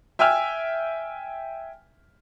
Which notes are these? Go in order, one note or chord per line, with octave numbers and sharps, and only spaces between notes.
E5 G5 G#5 E6 F6